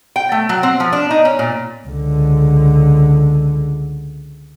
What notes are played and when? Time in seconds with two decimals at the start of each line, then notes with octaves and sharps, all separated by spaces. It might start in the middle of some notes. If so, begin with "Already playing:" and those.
0.16 G5
0.32 A3
0.49 F#3
0.63 C4
0.80 F3
0.93 D4
1.11 D#4
1.25 C#4
1.39 A#2
1.87 C#2 D3